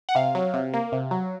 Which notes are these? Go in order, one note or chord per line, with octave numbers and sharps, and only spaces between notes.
F#5
C3 F5
F#3
C3
A#3
C3
F#3